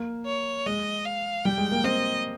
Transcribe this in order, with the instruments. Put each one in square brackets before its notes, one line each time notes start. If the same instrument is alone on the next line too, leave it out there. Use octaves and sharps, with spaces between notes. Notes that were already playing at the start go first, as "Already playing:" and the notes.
Already playing: [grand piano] A#3
[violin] C#5
[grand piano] G#3 [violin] D#5
[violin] F5
[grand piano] G3 [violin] G5
[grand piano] G#3
A#3
[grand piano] C4 [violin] D#5